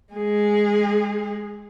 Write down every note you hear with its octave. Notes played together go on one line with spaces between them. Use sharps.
G#3 G#4